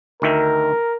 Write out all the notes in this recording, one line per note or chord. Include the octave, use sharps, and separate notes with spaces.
D2 D#3 A#4 E5